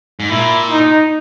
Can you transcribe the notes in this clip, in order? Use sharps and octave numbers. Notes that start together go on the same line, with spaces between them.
G#2
A#2 E4
D#4